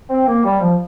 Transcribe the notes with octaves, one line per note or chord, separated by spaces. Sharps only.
C4
A#3
G3
F3